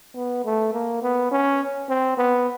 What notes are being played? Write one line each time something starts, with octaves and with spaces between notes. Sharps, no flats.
B3
A3
A#3
B3
C#4
C4
B3